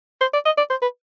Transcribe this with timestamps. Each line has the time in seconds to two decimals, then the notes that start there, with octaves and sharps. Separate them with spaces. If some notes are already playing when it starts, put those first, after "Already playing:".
0.21 C5
0.33 D5
0.46 D#5
0.58 D5
0.70 C5
0.82 B4